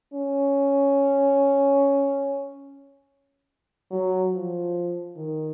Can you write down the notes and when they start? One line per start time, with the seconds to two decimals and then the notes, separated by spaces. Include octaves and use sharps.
0.13 C#4
3.91 F#3
4.33 F3
5.17 D#3